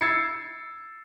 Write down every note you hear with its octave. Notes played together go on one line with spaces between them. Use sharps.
E6 G#6 A6 C7 C#7